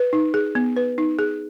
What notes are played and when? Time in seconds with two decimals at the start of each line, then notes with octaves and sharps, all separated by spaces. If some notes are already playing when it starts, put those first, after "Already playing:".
Already playing: B4
0.13 D#4
0.34 G#4
0.55 B3
0.77 B4
0.98 D#4
1.19 G#4